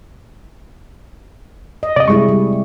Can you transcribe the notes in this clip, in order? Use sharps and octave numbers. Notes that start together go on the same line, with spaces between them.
D#5
C3 D5 D#5
G3 G#3 E4 C#6
G3